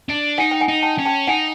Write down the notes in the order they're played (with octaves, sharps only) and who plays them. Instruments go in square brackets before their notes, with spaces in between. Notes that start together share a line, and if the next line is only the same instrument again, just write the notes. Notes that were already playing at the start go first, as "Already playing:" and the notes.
[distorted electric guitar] D4
[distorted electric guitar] D#4 [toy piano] F#5 G#5
[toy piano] G5
F#5 G#5
[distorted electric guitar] D#4
[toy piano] G5 A5
[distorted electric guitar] C#4
[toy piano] G5 A5
[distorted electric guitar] D#4 [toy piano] F#5 G#5